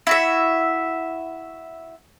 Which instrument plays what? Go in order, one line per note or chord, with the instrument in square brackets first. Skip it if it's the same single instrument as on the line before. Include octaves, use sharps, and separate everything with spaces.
[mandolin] E4 F#4 E5